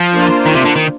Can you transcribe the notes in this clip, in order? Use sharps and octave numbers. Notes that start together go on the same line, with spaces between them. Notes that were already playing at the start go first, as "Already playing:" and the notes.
Already playing: F3
A#3 D4 F4 C5
D#3
C3
D3
D#3